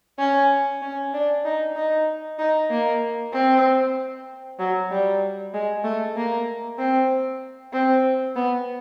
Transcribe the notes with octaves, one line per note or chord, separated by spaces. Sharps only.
C#4
C#4
D4
D#4
D#4
D#4
A#3
C4
F#3
G3
G#3
A3
A#3
C4
C4
B3